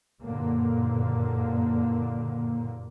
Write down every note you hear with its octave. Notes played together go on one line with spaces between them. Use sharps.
F#1 G2 A#2 D3 A#3